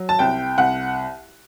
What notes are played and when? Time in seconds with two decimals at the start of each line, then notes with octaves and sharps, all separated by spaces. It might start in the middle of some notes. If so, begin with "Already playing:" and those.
Already playing: F#3
0.09 A5
0.19 C2 G5
0.58 C2 F#5